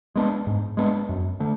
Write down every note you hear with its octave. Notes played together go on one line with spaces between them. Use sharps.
G#3 B3 D4
G#2
G#3 B3 D4
F#2
D3 A3